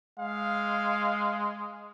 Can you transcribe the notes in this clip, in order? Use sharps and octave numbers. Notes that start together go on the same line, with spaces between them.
G#3 F5